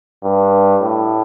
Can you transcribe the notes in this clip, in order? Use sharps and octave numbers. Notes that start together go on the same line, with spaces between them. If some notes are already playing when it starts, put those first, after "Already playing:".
G2
A2